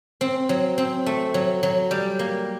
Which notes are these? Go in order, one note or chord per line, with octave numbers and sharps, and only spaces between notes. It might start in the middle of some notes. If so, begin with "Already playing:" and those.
C4
F#3
C4
A3
F#3
F#3
G3
A#3